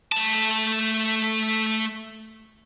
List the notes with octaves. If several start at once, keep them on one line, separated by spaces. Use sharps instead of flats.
A3 A5